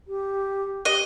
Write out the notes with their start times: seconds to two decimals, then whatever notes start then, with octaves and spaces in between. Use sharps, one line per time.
0.07 G4
0.85 G4 D#5